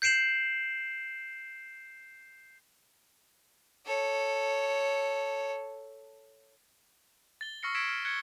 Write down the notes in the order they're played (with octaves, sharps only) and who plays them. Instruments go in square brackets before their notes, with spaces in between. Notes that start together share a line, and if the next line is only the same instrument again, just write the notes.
[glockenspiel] G6 C7 D7 E7 F#7
[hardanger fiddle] A4 C#5
[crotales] A6 G7
C#6 E6 F6 A#6 C7 C#7
E6 G#6 B6 C7 D7 E7
F6
F#6 G#6 C#7 G7